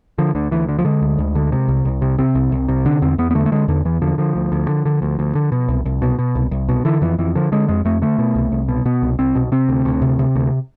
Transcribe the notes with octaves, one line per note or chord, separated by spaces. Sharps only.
D3 F3
D2 D3
D2 E3
D3
F3
D3 G#3
D2
D2
D3
C3
C2
C2
C3
C3 C4
C2
C2
C3
D3 D4
E2 C4
E2 B3
B3
D3 A3
A3
D3 G#3
E2 D3
E2 E3
D3 F3
D3 F3
D2
D2
D3
D3
D2
D2
D3
B2
C2
C2
B2
B2
C2
C2
B2
D3 E3
F2 E3
F2 E3
D3 F3
D3 G#3
F2 G#3
F2 A3
D3 A3
B2
C2
C2
B2
B2 B3
C2
C2 C4
B2
C3 C4
D2
D2
C3
C3
D2